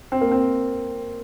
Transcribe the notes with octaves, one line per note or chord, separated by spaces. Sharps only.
C4
A#3
C4